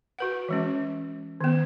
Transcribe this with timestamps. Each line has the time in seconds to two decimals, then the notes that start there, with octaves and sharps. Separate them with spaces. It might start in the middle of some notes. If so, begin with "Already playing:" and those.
0.19 F#4 B4 F#5
0.49 E3 G#3 C#4
1.41 D#3 B3